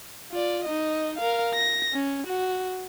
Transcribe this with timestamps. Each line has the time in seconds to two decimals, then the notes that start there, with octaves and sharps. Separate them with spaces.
0.32 F4 D5
0.65 D#4 D#5
1.18 A#4 F5
1.55 A#6
1.94 C#4
2.27 F#4